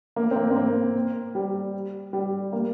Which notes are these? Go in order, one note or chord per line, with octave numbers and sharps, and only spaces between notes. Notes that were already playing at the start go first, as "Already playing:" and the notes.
A#3
C4
A#3
C4
A#3
G3
G3
A#3